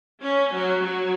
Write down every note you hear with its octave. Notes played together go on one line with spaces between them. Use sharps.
C#4
F#3
F#3